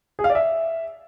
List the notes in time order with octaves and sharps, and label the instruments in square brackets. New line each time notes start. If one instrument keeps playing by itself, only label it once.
[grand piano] G#4
F5
D5
E5